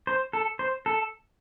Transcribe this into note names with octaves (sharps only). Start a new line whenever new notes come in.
C5
A4
C5
A4